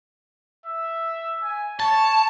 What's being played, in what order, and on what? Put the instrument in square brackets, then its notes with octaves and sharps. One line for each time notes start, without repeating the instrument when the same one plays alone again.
[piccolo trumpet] E5
G#5
[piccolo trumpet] C#5 [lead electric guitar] A5